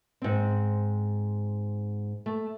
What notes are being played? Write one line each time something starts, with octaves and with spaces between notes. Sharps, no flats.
G#2 C4
A3